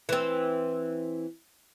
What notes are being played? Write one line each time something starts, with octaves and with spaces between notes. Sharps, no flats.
E3 C4